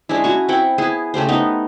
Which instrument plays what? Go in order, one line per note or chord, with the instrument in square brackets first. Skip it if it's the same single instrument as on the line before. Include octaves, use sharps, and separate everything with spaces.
[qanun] G#3 C#4 D4 E4
C#4 F#4 C#6
C4 E4 F#5 G5
B3 E4 G#4
C#3 A3 G4 C5
B3 D#4